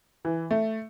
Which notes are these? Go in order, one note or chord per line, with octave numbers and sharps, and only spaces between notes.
E3
A3